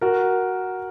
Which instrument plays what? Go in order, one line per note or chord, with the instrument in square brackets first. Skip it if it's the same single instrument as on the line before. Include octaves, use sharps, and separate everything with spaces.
[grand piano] F#4 A#4